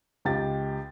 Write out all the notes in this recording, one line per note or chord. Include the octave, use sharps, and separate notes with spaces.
C#2 G4 A6